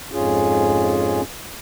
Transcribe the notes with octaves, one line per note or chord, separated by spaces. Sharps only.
F2 G#2 C#4 F4 G#4